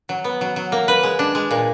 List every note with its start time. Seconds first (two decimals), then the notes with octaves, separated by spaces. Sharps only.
0.09 F#3
0.24 B3
0.41 F#3
0.56 F#3
0.72 A#3
0.88 B4
1.03 G#3
1.19 D4
1.35 G#3
1.51 A#2